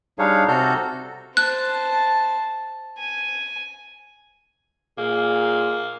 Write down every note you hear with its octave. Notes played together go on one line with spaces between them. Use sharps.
G3 D4 D#4 G#4 C#5 F5
C3 F#4 A4 A#5 F6 G6
C5 A5 F#6
G#5
A#2 A#3 G#4